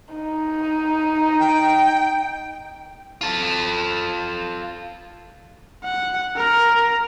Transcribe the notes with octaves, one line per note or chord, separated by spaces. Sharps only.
D#4
G5
F4 A4
F#5
A#4